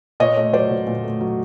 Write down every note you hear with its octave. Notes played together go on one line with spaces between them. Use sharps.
A#2 C#5 D#5
A3
F#3 C5 D5
A#2
A#2
A3
F#3